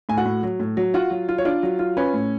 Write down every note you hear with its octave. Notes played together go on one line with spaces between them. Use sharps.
A2 G#5
F#4 F#5
A2
F#3
A2
F#3
F4 F#4 F#5
F#3
F4
C#5
D4 F4 D5
F#3
F4
C#4 B4
A2